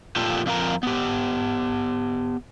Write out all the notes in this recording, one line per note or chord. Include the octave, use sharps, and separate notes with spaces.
A#2 F3 F4 G4 A4
F2 F3 F4 A#4 A#5
B3 G4